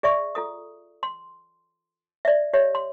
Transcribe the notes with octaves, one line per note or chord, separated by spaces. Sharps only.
G#4 D5 E5 C#6
F4 A4 D#6
C6
D5 E5
G4 C#5 E5
C6